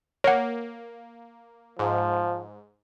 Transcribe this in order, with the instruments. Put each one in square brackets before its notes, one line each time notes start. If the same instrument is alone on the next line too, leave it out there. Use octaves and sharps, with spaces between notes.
[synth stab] A#3 [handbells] C#5 F#5
[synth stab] G#2 [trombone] F3